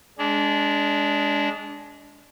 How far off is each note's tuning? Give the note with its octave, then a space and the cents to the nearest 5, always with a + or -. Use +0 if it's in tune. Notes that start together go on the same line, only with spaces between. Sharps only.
G#3 +5 D4 -20